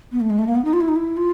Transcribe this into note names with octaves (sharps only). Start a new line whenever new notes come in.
B3
A3
G#3
A3
A#3
B3
D#4
F4
E4
D#4
E4
F4